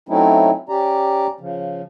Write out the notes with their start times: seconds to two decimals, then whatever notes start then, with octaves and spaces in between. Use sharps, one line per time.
0.09 F#3 A3 C4 C#4 D#4 E4
0.69 C#4 G4 D5 A#5
1.40 C#3 F3